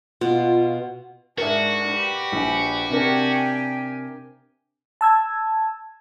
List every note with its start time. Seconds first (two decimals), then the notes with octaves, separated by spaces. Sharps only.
0.21 B2 F4
1.38 G#2 D4 F#4 G#4 A#4 E5
1.88 G4 B4 D5
2.32 A#1
2.90 C3 D4 G4 A#4 G5 G#5
5.01 A5 E6 G#6